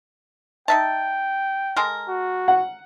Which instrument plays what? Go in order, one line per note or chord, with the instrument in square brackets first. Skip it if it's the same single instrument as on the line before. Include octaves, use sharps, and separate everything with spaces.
[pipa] D#4 E5 A5 [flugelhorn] G5
[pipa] G#3 A4 A#4
[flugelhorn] F#4
[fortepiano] F#5